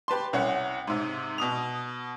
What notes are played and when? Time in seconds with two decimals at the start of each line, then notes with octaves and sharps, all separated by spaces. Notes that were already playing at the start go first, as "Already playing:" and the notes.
0.08 G4 B4 A5 C6
0.33 C2 C#4 F#5
0.87 G#2 C3
1.38 B2 D#6 F7